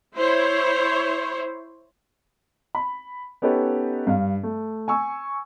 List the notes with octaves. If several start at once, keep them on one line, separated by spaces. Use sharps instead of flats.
E4 C5 C#5
B5
B3 C#4 D#4 G4 A4 B4
G2 F5
A3
G#5 C#6 E6